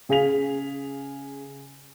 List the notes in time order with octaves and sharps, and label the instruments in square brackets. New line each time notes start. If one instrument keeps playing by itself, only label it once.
[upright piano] C#3 G#4 F5 B6 F7